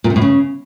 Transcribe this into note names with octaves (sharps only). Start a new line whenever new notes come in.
A#2
C3
A2
C#3